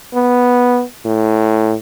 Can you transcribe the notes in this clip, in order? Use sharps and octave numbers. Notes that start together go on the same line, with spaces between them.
B3
A2